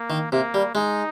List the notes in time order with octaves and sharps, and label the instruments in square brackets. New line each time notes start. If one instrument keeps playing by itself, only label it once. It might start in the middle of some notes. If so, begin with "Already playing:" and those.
Already playing: [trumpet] A#3
[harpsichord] D#3
[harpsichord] C3 [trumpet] A#3
[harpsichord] G3
[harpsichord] G#3 [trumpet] D#4